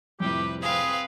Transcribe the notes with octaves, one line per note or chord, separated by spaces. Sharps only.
F2 A2 C3 G3 G4 B4
C4 G#4 B4 F5